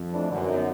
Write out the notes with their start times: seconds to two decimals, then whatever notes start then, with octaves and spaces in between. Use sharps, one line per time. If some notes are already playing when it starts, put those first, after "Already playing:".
Already playing: F2
0.11 E3 A3 D4
0.30 F#2 D3
0.48 F#3 B3 D#4